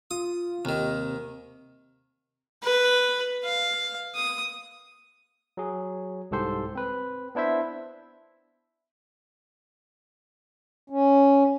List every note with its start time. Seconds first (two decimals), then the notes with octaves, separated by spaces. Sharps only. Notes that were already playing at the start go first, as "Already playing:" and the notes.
0.11 F4 D#6
0.65 D#2 C3 D#3
2.64 B4
3.45 F5
4.16 D#6
5.57 F#3 G#4
6.31 C2 G#2 G4 A4 C5 C6
6.75 C4 B4
7.35 B3 D4 E4 C5 E5
10.90 C#4